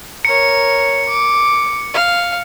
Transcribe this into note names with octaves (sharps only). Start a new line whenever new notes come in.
A#4 C#5 C#7
D6
F5